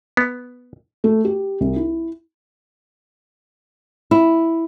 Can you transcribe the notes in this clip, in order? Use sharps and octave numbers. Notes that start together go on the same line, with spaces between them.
B3
A3
G4
C2
E4
E4